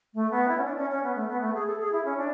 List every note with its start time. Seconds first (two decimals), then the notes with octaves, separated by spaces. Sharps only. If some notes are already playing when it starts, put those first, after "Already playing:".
0.14 A3
0.31 B3
0.48 E4
0.58 C#4
0.65 D4
0.77 C#4
0.90 C#4
1.03 B3
1.16 A3
1.29 B3
1.41 A3
1.54 G#4
1.66 A4
1.80 G#4
1.92 E4
2.05 C#4
2.18 D4